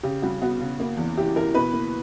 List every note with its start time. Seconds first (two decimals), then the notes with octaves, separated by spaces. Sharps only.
0.03 C#3 G4
0.22 G3 F#4
0.42 B3 F#4
0.60 C#3
0.80 A#3
0.97 E2
1.17 E3 G4
1.36 E3 A#4
1.54 B2 B4
1.73 A#3